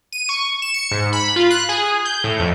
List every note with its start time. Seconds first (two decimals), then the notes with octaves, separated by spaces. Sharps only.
0.12 D#7
0.29 C#6
0.62 E7
0.74 C#7
0.91 G#2
1.13 B5
1.36 F4
1.50 F#6
1.69 G#4
2.05 G6
2.24 A2
2.39 F2